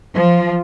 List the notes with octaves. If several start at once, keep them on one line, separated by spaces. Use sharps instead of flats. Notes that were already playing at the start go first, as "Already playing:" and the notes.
F3